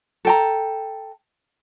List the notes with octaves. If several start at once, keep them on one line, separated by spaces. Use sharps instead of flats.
A4 G5 A#5